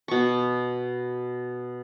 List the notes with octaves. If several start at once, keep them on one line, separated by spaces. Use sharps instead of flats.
B2 C#6